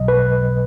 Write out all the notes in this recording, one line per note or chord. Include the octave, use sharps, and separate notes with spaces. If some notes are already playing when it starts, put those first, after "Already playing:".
Already playing: B1 B2 F#3 D#5
B4